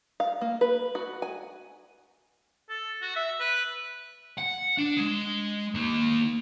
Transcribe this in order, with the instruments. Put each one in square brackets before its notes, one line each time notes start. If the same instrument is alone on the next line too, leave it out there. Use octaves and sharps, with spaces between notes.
[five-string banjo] F5
A#3
B4
F#4
G#5
[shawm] A4
F#4
E5
B4
[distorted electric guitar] F#5
D4
G#3
A#3 D#4